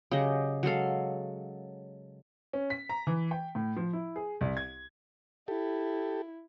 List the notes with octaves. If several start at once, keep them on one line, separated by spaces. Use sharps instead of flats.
C#3 F#3 G4 D#5
F#3 G#3 A4 F5
C#4
B6
A#5
E3
G5
A2
F3
E4
G#4
C2
G#6
E4 G4 A4